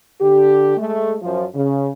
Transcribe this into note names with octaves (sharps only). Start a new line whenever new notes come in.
D3 G4
G#3 A3
F#2 F3
C#3